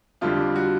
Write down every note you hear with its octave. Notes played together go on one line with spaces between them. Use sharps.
F2 D3 G3 F4
F#4